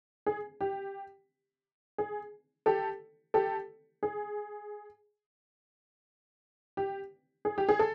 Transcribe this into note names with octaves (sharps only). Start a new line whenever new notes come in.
G#4
G4
G#4
G4 A4
G4 A4
G#4
G4
G#4
G4
G#4
A4